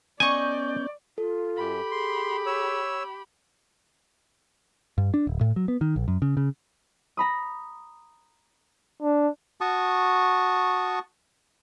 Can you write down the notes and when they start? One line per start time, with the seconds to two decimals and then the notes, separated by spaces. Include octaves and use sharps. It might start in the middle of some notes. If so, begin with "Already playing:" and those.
0.20 B3 C#4 D5 D#5 G#5 C#6 G6
1.18 F4 A4
1.57 F#2 G4 B5
1.91 G#4 C6
2.47 C#5 E6
4.98 G2
5.14 D4
5.27 D1
5.41 A2
5.56 F#3
5.68 B3
5.81 D#3
5.96 A#1
6.08 F#2
6.22 C#3
6.37 C#3
7.17 A#5 B5 D#6
9.02 D4
9.61 F#4 A5 C#6 D#6